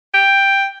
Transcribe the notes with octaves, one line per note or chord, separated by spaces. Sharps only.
G5